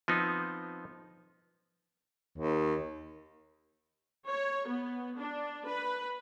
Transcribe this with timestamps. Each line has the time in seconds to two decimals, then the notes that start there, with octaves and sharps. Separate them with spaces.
0.08 F3 B3 C4 D#4
2.38 D#2
4.27 C#5
4.69 B3
5.19 D4
5.66 B4